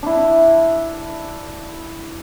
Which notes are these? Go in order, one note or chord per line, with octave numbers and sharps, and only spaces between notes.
D4 E4